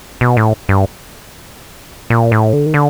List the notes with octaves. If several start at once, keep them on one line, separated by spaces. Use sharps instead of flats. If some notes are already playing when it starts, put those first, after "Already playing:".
B2
A2
G2
A#2
A2
D3
D#3
D3